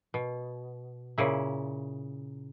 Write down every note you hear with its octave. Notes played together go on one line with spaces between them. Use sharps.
B2
A#2 C#3 E4